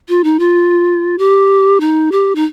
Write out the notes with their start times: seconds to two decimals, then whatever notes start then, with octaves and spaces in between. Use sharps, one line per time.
0.09 F4
0.24 D#4
0.39 F4
1.18 G4
1.80 D#4
2.12 G4
2.35 D#4